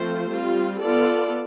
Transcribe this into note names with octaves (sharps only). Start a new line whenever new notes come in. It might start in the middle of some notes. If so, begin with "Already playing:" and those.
Already playing: F3 A3 C4 F4 C5
G3 C4 F4
B3 F4 A4 D5